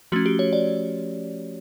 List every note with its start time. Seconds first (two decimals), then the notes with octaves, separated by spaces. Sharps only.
0.12 F3 A3 C#4 F#4
0.26 G4
0.39 C#5
0.53 D5